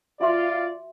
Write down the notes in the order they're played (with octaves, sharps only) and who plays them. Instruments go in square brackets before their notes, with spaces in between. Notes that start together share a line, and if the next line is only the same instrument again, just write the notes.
[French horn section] F4 [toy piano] F#4 E5 C6 [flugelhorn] D5